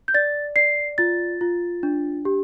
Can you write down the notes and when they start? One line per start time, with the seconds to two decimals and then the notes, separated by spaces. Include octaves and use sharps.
0.08 G6
0.14 D5 A6
0.56 D5 C7
0.98 F4 A6
1.41 F4
1.83 D4
2.25 G4